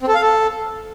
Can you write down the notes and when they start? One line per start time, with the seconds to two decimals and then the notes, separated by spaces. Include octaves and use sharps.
0.01 C4
0.08 A4
0.15 F5
0.21 A4